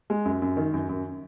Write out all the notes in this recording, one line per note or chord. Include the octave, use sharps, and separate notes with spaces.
G#3
F#2
F#2
D#3
F#2
F#2